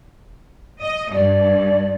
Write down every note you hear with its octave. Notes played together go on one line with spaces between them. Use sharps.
D#5
G2 D5